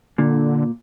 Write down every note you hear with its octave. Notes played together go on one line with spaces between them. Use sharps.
A#2 D3